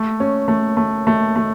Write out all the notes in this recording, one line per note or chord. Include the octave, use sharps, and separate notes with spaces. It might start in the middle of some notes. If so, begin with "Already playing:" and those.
Already playing: A3
C#4
A3
A3
A3
A3